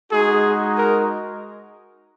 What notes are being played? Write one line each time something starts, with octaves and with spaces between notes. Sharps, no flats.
G#3 D#4 F#4 G#4
A#4